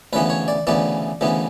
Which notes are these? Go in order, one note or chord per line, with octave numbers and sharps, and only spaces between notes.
D2 C#3 E3 B3 B4
C#5
D5
D2 C#3 E3 B3 D5
D2 C#3 E3 B3